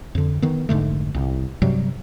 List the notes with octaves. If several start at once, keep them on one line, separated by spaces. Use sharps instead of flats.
F2 D3
D#3 B3
F1 G#2 D3 A3
C2
G2 C3 F#3 G3